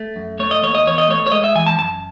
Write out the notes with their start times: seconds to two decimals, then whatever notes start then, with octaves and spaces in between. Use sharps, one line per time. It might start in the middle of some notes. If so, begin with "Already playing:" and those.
Already playing: A3
0.16 F#2
0.39 A3 C#5
0.51 D#5
0.63 D#2 C#5
0.75 D#5
0.86 E2 C#5
0.98 D#5
1.08 A3 C#5
1.26 C#5
1.31 G#3 D#5
1.44 E5
1.55 E3 G#5
1.67 A5
1.78 F#2 A5